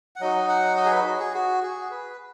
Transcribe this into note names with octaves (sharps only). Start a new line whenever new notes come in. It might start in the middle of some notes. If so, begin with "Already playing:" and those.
F#5
F#3 D#4 F#4 D#5
F#5
D#5
G#4
B4
F#4
G#4
F#4
G#4
B4